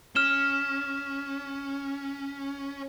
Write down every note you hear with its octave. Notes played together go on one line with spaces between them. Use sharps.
C#4 F6 E7 G7